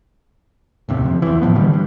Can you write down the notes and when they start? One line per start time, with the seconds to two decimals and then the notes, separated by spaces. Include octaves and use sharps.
0.89 D1 D#2 C3
1.04 F#1 F2
1.22 E2 E3
1.42 A2 D#3 F3 B3
1.55 D3 E3 G3 G#3
1.73 G2